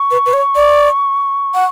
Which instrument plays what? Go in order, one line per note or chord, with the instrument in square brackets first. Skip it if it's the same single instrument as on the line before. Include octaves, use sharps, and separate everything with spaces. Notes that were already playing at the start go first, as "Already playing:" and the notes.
Already playing: [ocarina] C#6
[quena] B4
B4
C#5
D5
F#5